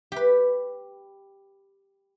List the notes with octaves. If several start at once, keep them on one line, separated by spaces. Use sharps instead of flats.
G4 B4